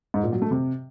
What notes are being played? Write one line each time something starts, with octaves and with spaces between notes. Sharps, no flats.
G#2
A#2
F#3
A3
C3